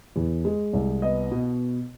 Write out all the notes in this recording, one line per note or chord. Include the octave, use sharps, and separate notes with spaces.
E2
G#3
C2
B3 D#5
B2